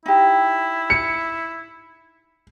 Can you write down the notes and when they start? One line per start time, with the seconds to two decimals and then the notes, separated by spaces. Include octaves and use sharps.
0.06 D#4 E4 G4
0.90 C#7